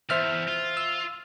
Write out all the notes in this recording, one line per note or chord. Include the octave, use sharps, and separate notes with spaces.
E2 C5 E5 F6
F4
E6